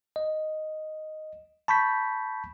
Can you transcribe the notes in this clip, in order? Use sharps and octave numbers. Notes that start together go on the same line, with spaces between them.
D#5
A5 B5 C#6 G6 B6